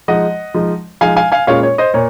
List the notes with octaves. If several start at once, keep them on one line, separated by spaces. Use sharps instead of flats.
F3 G#3 D#4 D#5 F#5
F3 G#3 D#4
F3 G#3 D#4 F5 G#5
F5 G#5
F5 G#5
A#2 G#3 C#4 F4 C#5 F5
C#5
C5 D#5
A#2 C#5